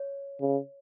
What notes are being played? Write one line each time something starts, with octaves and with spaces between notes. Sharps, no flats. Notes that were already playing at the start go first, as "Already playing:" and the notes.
Already playing: C#5
C#3